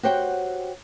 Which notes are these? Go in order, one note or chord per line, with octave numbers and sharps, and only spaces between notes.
F#4 G4 C5 C#5 F#5 G5